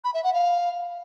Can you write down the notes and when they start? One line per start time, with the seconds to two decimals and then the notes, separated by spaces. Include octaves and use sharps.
0.04 B5
0.14 E5
0.24 F#5
0.34 F5